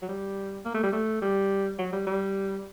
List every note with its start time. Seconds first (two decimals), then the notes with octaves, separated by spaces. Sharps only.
0.02 F#3
0.08 G3
0.65 A#3
0.74 A3
0.83 G3
0.93 A3
1.22 G3
1.78 F#3
1.92 G3
2.06 G3